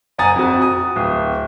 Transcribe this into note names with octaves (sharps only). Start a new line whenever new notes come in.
F#1 F#5 G#5 A#5 D#6 A6
F2 F#4
D#6
D1